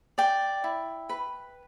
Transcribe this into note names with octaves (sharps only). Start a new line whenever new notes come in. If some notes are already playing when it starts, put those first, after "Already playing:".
D5 G5
E4
B4